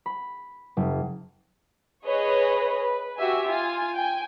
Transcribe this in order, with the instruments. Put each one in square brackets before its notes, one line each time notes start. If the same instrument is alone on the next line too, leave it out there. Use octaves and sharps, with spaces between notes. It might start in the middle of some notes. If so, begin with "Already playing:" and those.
[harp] B5
F#1
[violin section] G#4 B4 C#5 D#5
B4
F#4 G4 E5 G#5
F4 G#5
G5 G#5